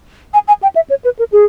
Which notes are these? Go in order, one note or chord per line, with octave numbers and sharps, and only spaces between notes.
G#5
G#5
G5
E5
C#5
B4
A#4
G#4